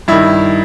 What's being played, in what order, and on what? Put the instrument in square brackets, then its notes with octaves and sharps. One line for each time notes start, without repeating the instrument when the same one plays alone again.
[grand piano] G2 D#3 E4